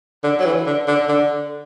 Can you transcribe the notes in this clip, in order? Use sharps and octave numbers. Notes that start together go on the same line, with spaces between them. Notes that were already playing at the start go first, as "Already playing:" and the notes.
D3
F#3
E3
D3
D3
D3